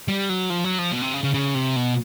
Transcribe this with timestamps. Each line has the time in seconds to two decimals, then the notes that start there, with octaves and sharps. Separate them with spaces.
0.08 G3
0.29 F#3
0.50 F3
0.64 F#3
0.79 F3
0.92 B2
1.02 C3
1.13 C#3
1.24 C#3
1.34 C#3
1.55 C3
1.76 B2